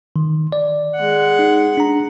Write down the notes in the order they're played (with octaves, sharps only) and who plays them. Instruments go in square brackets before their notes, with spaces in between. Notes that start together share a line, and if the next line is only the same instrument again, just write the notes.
[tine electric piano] D#3
D5
[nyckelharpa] G#3 F#5
[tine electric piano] D#4
D4 A#5